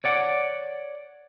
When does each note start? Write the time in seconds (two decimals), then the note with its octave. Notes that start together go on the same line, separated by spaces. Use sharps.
0.04 C#5 D5 F#5